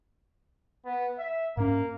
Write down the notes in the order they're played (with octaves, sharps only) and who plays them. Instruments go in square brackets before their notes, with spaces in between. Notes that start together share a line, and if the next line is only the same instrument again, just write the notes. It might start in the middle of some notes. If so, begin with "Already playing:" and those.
[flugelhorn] B3
E5
[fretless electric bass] G#2 C#4 [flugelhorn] A#3